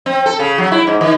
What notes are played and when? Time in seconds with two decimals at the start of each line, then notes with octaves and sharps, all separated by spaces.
0.06 C4
0.26 A4
0.39 C#3
0.58 F#3
0.72 E4
0.87 G#2
1.01 D#3